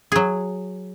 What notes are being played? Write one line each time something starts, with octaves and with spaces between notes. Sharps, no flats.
F#3 G#4